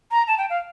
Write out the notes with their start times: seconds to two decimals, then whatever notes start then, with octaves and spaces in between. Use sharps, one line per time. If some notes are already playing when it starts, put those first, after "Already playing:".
0.11 A#5
0.28 A5
0.38 G5
0.50 F5